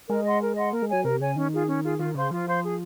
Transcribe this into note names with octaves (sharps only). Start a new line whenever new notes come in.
G#3 A#4
D#5 F#5 C6
A#4
D#5 F#5 C6
A#3 A#4
G#3
F#3 C#5 G#5
C3 A#4
C#3 C#5 G#5
D#3 C#4
F4 G#4
C#4
F4 G#4
D#3 F4
C#3 C5 F5 C6
F3 F4
C5 F5 C6
G#4